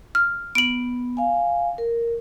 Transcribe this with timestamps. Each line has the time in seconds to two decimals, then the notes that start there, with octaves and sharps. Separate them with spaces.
0.15 F6
0.55 B3 D7 F#7
1.17 F5 G#5
1.78 A#4